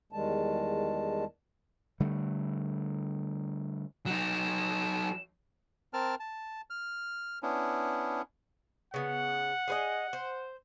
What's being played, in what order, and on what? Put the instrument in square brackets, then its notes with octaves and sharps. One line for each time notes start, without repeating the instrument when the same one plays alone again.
[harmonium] E2 D#3 G3 G#3 A5
[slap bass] D3 G3 A3
[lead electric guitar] F#3 D#4 [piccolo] E7
[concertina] C4 A#4 A5 F6
A5
F6
B3 C#4 D4 E4
[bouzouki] C#3 B3 [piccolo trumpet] F#5
[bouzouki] G#4 B4 D#5
C5